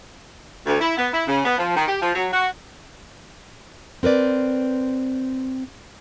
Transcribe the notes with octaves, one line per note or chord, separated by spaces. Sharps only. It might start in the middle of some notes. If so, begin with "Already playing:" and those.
D2
E4
B3
E4
C#3
B3
F3
D#3
G4
F3
F#3
F#4
C4 A#4 B4 D5